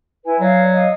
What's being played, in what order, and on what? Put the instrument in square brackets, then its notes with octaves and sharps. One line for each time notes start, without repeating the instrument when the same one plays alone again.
[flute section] E4 B4 G#5
[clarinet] F#3 [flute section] D5 F5
[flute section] D#5 F5